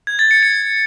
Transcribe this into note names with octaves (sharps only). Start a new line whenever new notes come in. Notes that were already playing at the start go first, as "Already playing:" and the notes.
G#6
A6
C#7
C#7